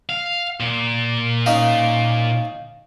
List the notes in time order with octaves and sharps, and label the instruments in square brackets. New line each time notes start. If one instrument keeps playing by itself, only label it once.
[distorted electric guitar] F5
A#2
[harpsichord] C#4 D#4 F5